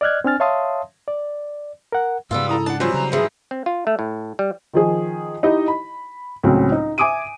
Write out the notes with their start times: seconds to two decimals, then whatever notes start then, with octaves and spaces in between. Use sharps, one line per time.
0.01 D5 D#5 F6 F#6 G#6
0.24 C4 D4 G#5 F6 A6
0.40 C#5 E5 F5 A5 C6 D#6
1.08 D5
1.92 A#4 F#5
2.31 G#2 C#3 G3 B3 F4 E6
2.49 E4 A4 A#5 D#6
2.66 D4 F#5 A5
2.80 E3 F#3 G3 C4 F4 C5
2.94 C#3 A#5
3.12 G#2 E3 G#4
3.51 C4
3.66 F4
3.87 A3
3.99 A2
4.39 G3
4.74 D#3 F3 G#4
5.43 D#4 E4 G4 D#5
5.68 B5
6.43 C#2 A2 F#3 C4 C#4
6.72 D#4
6.98 E5 G#5 D6 D#6 D7 D#7